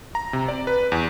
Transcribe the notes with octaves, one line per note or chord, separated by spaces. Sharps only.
A#5
C3
D5
B4
E2